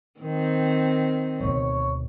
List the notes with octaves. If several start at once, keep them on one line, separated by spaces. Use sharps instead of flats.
D#3 C4
D2 B2 C#5